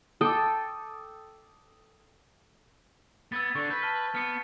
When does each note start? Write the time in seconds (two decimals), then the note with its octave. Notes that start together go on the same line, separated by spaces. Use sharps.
0.21 A4 G5 D6 D#6
3.32 B3 E6 G#6 A6
3.55 D3 C#6
3.71 B4 G6 B6
3.82 A5 F6 G7
4.15 B3 F6 C#7